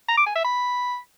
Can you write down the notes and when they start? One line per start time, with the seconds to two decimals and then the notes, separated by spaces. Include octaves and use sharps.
0.09 A#5
0.18 D6
0.27 G#5
0.36 E5
0.45 B5